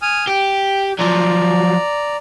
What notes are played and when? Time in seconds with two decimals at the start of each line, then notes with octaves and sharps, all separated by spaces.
0.02 G#5 D#6 F6
0.28 G4 G5
0.99 F3 F#3 D5 A#5